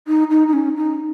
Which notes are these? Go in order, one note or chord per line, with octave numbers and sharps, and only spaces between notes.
D#4
D#4
D#4
C#4
D#4